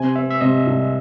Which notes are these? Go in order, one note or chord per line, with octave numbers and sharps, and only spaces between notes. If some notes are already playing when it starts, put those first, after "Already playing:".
Already playing: C3 C4 G#5
C4 E5
E5
C3 D#5
C2